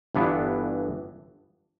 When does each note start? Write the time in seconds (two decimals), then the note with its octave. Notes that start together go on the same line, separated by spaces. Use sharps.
0.15 G1 G2 E3 B3 D4